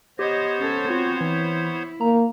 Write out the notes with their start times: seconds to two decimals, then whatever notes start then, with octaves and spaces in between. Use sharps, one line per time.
0.19 B3 G4 C5 C#5 D#5
0.60 C#4 A4
0.90 C4 F4 F#4
1.21 E3 E4
2.01 D#3 A#3 A#5